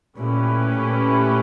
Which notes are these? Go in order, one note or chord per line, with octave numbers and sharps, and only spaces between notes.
A#2 A3 C#4 E4 G4 B4
A#2